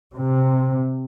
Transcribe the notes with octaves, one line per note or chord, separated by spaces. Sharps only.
C3